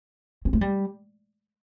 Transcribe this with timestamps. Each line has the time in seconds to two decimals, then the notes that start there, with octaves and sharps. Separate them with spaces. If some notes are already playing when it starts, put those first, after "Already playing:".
0.45 C4
0.53 A3
0.61 G3